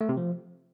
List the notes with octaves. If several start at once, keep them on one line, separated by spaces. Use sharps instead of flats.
A3
C3
F3